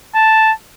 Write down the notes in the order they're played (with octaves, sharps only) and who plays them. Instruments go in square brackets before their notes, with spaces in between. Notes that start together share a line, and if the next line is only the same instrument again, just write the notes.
[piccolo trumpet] A5